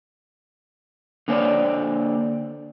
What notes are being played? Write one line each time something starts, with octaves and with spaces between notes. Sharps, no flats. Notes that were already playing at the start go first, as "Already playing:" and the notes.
D3 A#3 C4 C#5 D5